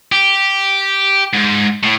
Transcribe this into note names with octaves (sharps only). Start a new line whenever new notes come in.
G4
G#2
A2